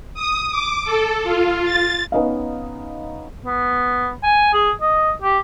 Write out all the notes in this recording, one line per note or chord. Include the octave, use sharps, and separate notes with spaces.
D#6
D6
A4
F4
A6
B3 C#4 D#4 D#5 F5
B3
G#5
G#4
D#5
G4